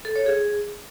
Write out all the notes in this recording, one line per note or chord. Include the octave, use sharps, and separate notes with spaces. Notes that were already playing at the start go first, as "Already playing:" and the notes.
A4
C#5
G#4